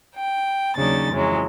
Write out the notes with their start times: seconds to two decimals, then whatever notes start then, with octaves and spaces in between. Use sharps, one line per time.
0.17 G5
0.76 D#2 C#3 F#3 D4 D#4 A6
1.12 F2 C#3 E3 F#3 G#3